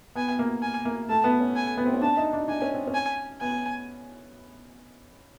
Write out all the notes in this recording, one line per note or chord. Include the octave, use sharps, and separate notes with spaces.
B3 G#5
B3
A#3
G#5
A#3
A3 A5
B3
C#4
G#5
B3
C4
C#4
D4 A5
D#4
D4
D4 G#5
C#4
C4
C#4
G#5
B3 G#5